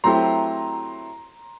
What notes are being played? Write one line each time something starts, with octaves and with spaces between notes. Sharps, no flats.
F#3 A3 C4 E4 G4 A#5 C6